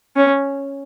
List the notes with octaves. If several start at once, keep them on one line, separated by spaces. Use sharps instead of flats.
C#4